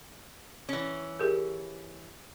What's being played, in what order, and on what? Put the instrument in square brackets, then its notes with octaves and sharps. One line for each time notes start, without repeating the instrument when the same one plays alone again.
[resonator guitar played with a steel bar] E3 C#4
[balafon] G4 G#4 A#4